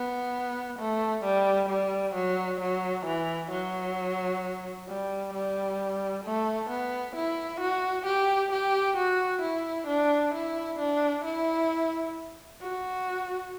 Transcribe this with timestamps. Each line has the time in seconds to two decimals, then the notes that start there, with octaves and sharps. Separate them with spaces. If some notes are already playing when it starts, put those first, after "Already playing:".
Already playing: B3
0.79 A3
1.24 G3
1.69 G3
2.15 F#3
2.60 F#3
3.06 E3
3.51 F#3
4.88 G3
5.34 G3
6.24 A3
6.70 B3
7.16 E4
7.60 F#4
8.06 G4
8.52 G4
8.97 F#4
9.42 E4
9.88 D4
10.34 E4
10.79 D4
11.25 E4
12.61 F#4